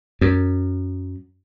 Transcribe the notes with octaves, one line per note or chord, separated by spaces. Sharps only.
F#2